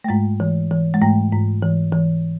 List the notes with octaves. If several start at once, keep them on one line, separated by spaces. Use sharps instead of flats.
A3
G#2 G#3
E3
E3
G#3
G#2 A3
G#2
E3
E3